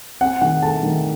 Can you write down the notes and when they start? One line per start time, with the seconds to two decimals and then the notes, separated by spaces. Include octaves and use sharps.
0.21 C4 F#5
0.41 D#3 F#5
0.62 A3 A5
0.83 D#3